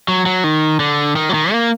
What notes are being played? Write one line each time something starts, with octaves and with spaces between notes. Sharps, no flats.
F#3
F#3
D#3
D3
D#3
F#3
D#3
A#3